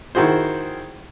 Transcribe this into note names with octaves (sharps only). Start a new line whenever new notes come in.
D#3 E4 F#4 G#4 C5